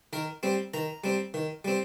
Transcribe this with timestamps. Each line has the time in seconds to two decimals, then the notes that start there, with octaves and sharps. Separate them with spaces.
0.13 D#3 A#4
0.43 G3 C4
0.74 D#3 A#5
1.04 G3 C4
1.34 D#3
1.65 G3 C4